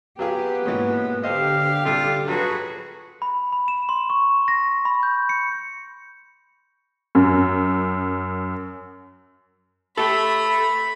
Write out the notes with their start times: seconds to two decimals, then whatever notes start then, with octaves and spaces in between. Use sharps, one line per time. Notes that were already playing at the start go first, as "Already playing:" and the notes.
0.19 F#3 B3 F4 G4 G#4
0.66 G#2 B2 E3 G#3 A#3 C#4
1.23 D3 G4 A4 C5 D#5 F5
1.85 C3 G3 D4 F4 A4
2.28 F3 F#3 F#4 G#4 B4
3.22 B5
3.52 B5
3.68 E7
3.89 C6
4.10 C#6
4.48 A#6
4.85 B5
5.03 G6
5.29 C#7
7.15 F#2
9.97 A3 G4 A4 B5